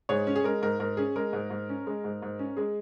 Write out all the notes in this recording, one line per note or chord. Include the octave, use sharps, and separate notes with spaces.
G#2 G#4 C#5
C#4
G#4
G#3 A#4
G#2 A#4
G#2 A#4
C#4 G#4
G#3 A#4
G#2
G#2
C#4
G#3
G#2
G#2
C#4
G#3 G#4